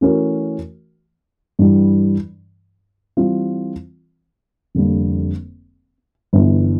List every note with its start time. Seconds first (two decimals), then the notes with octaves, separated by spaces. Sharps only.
0.01 E3 A3 C#4 F#4 A#4
1.59 G2 E3 G3
3.17 E3 G3 C4 F4
4.75 F1 F2 D3 G3 A#3
6.33 G1 G2 E3